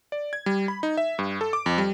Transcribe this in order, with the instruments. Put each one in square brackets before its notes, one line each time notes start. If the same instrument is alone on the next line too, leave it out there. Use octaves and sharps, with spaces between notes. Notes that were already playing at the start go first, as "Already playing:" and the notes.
[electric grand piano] D5
G#6
G3
B5
D#4
E5
G2
A4
D6
F2
G3